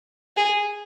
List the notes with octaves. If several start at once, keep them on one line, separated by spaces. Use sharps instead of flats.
G#4